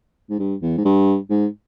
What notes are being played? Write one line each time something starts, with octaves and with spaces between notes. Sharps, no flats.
G#2
G2
E2
G#2
G2
G#2